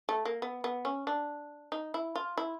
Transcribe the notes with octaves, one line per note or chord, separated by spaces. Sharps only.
A3
A#3
B3
B3
C#4
D4
D#4
E4
F4
E4